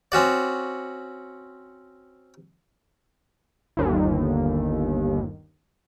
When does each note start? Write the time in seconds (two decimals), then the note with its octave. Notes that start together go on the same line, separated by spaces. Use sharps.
0.12 C4 C#4 F#4 D5
3.77 G1 D#2